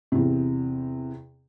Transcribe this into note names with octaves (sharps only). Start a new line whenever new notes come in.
E2 C3